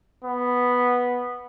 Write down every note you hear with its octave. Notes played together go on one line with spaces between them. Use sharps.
B3